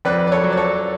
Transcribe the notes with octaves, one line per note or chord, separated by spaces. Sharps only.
F2 B4 D5
D5
A4 C#5
F#3
D5
A4 C#5